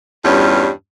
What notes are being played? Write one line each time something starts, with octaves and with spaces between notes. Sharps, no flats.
E2 G2 G3 C#4 F4